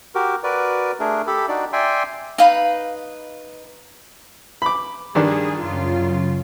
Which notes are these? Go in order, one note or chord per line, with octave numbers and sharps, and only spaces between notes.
F#4 G4 A#4
F#4 A#4 B4 D5
A3 D4 G#4 A#4
G4 A4 B5
D4 D#4 F#4 D5
D5 E5 G5 G#5 C6
D#4 B4 F5 B5
B5 D6
G2 D#3 D4 G#4
F#2 C#3 F4